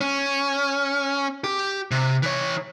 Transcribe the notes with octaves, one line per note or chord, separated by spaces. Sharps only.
C#4
G4
C3
E3 C#5